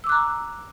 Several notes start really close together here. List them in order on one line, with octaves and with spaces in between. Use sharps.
E6 D6 F#6 A#5